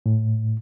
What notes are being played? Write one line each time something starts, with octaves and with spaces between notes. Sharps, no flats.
A2